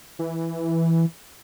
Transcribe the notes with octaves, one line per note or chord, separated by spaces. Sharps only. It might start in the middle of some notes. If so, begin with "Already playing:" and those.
E3